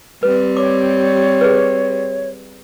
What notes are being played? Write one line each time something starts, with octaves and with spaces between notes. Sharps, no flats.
G3 C4 B4
C#5 D6
G#4 B4